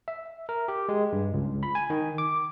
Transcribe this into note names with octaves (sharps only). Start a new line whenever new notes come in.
E5
A#4
G4
G#3
G2
C#2
B5
G#5
D#3
D6